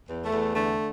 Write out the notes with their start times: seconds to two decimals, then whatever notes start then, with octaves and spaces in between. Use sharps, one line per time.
0.09 E2
0.24 A3
0.32 E2
0.55 D3 A3